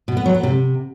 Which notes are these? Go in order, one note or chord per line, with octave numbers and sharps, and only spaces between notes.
B2
B3
F#3
B3
C3